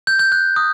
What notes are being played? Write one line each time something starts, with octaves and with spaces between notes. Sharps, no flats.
G6
G6
F#6
D#6